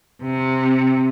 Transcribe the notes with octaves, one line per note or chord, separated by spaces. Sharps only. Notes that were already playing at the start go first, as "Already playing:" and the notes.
C3